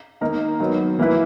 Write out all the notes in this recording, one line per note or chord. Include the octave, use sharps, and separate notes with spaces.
D#3 A#3 D#4 A#4
D#3 F#3 B3
E3 A#3 E4 B4